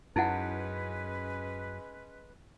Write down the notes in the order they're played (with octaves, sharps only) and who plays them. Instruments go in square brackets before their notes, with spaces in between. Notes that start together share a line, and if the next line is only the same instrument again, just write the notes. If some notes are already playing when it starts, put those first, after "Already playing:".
[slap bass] F#2 [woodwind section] G#3 C#4 B4 [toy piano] D#4 E4 F#5